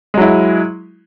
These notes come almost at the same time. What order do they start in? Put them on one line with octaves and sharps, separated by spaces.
G#3 F#3 E4